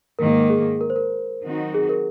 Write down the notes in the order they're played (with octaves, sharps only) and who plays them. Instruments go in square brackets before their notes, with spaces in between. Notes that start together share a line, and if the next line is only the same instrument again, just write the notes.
[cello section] G#2 D#3 A#3 [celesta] A#4
[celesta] G#4
A#4
C5
A#4
[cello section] D#3 F#3 C4 D#4 F#4
[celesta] G#4
A#4